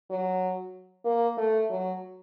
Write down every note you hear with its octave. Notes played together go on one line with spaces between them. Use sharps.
F#3
A#3
A3
F#3